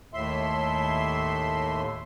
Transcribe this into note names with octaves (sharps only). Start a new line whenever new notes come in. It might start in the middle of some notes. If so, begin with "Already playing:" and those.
D#2 A2 E5 C6